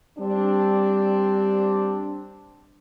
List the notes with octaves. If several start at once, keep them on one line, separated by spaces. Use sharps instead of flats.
G3 C4 D4